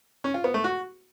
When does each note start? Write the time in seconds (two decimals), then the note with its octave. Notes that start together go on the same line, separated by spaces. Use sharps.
0.24 C#4
0.34 F4
0.44 B3
0.54 A3
0.64 F#4